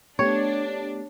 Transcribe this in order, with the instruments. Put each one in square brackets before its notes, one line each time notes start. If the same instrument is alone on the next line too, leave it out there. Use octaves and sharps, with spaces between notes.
[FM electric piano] A3 B3 G4 [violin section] D4 [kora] C#5